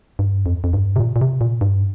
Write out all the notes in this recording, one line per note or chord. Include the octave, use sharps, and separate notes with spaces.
G2
F2
F2
G2
C3
A#2
A#2
C3
A#2
G2